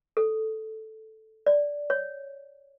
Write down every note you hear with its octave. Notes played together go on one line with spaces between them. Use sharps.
A4
D5
C#5